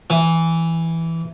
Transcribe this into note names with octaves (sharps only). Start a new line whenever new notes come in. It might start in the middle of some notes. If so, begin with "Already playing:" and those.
E3